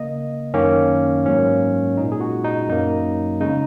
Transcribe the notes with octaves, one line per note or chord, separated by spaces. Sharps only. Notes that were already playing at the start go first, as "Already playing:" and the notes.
Already playing: C#3 A#3 D#5
F#2 D#3 A#3 C#4
G#2 F#3 A#3 C#4
A#2 G#3 D#4
G#4
F#4
D#4
F#2 F#3 A#3 D#4
C#3 G#3 D#4